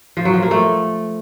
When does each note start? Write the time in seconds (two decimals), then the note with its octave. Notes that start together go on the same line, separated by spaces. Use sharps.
0.17 F3
0.25 F#3
0.34 F3
0.42 A#3
0.51 A3